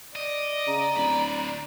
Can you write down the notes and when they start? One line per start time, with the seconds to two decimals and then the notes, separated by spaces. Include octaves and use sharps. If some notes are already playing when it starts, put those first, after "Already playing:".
0.15 D5 D#5
0.67 C#3 A#5
0.96 D1 D2 B5